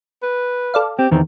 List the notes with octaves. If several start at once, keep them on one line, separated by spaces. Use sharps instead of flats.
B4
A4 D5 F5
C4 G4
E2 D#3 C4